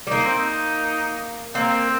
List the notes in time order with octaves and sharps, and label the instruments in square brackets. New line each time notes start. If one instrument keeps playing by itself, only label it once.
[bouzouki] G3
[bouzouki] A#3 [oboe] D#4
[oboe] C4
D#4
[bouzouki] A#3 [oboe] C4